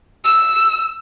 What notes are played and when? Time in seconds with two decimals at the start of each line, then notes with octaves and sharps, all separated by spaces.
0.25 E6